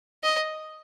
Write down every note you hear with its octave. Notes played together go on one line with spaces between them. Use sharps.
D#5